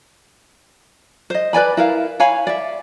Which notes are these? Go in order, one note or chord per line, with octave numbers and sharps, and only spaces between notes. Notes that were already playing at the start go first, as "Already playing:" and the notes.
C5 D#5
B4 D5 G#5 B5
E4 A#4 F5
C#5 F5 G#5 B5
D5 E5